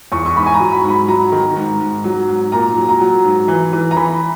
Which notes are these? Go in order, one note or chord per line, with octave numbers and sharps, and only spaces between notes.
E2 C#6
C#6
G#2 B5
G#5
A#5
F#3
B5
G#2
B5
F#3 A#5
D#3
G#2
G#2
F#3
G#2
A#2 A#5
F#3
A#5
F#3
G#2
E3
E3
A#5
E3 B5